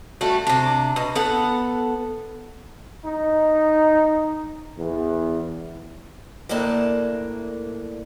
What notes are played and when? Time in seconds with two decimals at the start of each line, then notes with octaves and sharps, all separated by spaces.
0.21 G3 A3 F#4
0.47 C3 D4
0.96 B2
1.15 B3 A4 F#5
3.05 D#4
4.77 E2
6.49 D2 A2 A#3 D4 A5